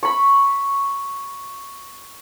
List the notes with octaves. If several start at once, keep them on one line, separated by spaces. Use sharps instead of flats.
B5 C#6